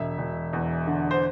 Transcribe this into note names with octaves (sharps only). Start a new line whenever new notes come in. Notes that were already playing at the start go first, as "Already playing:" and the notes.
Already playing: E1 E5
E1
E2
D3
C5